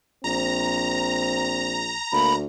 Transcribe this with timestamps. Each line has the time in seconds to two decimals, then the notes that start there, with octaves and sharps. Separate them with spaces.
0.24 A#1 C4 A#5
2.12 D2 A#3 B5